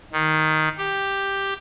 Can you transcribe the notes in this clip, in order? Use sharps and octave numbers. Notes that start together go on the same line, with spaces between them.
D#3
G4